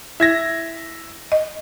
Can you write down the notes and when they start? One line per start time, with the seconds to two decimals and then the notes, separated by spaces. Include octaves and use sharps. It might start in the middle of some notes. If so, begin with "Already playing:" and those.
0.20 E4 E5 G#6 A#6
1.32 D#5